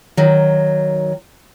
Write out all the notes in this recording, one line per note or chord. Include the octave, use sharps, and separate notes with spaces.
D#3 F#3